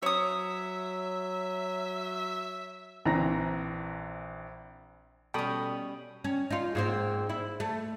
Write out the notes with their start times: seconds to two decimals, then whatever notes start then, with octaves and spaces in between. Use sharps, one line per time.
0.03 F#3 C#5 E5 D#6
3.06 A#1 E3 C4 A#5 A#6
5.34 B2 G3 C#4 A4 G5 B5 D#6
6.24 C#4
6.50 D#4 F4
6.75 G#2 A#3 C4
7.29 E4
7.60 A3